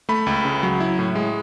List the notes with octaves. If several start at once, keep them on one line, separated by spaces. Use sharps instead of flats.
A3 B5
C#2
C#3
F#3
E4
A2
G#3